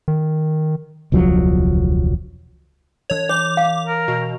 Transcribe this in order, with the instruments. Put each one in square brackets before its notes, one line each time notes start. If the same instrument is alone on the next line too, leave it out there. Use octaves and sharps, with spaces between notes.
[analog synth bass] D#3
[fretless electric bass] E1 C#2 F3 F#3
[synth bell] E3 F7 [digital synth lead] C#5
[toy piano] C#5 [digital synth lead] D6
[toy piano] F5
[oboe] A#4
[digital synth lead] B2